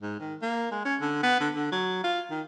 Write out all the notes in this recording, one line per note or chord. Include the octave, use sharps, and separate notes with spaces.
G#2
D#3
A#3
G#3
C#4
D3
B3
D3
D3
F#3
F4
D#3